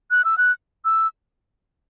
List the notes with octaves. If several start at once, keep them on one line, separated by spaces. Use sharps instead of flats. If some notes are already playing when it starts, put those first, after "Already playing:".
F#6
E6
F#6
E6